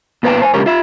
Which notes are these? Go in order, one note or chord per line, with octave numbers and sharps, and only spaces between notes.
A#2 B3 B4 F5 G5 A5
C5 G#5
C#3 G#3 G4 A#4 C#5
F4 E5